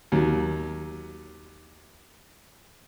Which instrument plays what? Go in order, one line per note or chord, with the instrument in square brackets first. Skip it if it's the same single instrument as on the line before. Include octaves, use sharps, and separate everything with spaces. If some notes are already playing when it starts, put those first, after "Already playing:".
[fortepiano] D#2 F#3